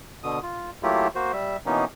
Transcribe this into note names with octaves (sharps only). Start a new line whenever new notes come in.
B2 D3 D#6
F4
F#3 A3 A#3 E4 F4 G4
A#3 F#4 C5
G3 E5
B2 E3 A#3 B3 C#4 D#4